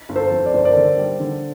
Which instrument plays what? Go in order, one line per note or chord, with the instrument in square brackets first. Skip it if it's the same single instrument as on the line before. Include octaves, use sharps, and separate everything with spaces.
[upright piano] G1
[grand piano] A4 C5
[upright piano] F2
[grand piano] D5
[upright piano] G1 [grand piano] C5
[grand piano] A#4 D5
[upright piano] D3
G3
D3